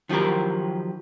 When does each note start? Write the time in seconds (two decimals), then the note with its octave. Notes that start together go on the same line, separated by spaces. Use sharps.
0.09 D#3 F3 F#3 G4 A#4